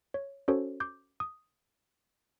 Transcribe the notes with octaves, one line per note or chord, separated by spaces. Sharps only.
C#5
C#4 F#4 A4 C5 C#5
D6 G6
D#6